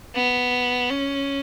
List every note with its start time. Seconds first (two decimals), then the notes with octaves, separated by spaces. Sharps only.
0.15 B3
0.90 C#4